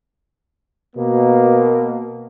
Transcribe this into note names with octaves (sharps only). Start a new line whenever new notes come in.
B2 A#3